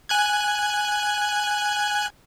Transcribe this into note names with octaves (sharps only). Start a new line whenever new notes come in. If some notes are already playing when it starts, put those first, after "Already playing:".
G#5 F#6 G#6